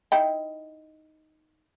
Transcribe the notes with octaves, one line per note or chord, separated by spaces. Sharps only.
D#4 E4 G5